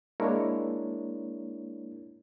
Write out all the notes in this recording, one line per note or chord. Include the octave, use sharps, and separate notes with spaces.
G#3 A#3 D4 E4 A#4 C#5